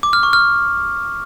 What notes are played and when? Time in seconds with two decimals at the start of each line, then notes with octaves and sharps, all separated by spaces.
0.03 D6
0.13 F6
0.23 C#6
0.33 F6